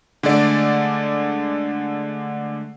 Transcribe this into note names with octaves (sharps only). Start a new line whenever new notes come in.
D3 G#3 A3 D5